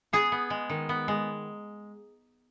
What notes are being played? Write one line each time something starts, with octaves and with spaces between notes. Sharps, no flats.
B3 G#4
B3
G#3
D#3
B3
G#3